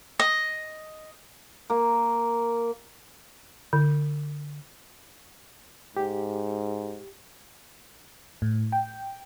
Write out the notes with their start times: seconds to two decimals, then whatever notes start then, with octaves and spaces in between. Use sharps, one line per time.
0.19 D#5
1.70 A#3
3.73 D3
5.97 G#2 G4
8.42 A2
8.72 G5